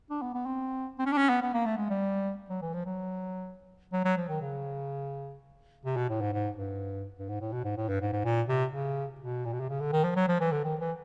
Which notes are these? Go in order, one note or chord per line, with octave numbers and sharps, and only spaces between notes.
D4
B3
B3
C4
C4
C#4
D4
C#4
B3
B3
A#3
A3
G#3
G3
F#3
E3
F3
F#3
F#3
F#3
F3
D#3
C#3
C3
B2
A2
G#2
G#2
G2
G2
G#2
A2
B2
G#2
A2
G2
G#2
G#2
A#2
C3
C#3
B2
A#2
B2
C3
C#3
D3
D#3
F3
F#3
F3
E3
D3
D#3
E3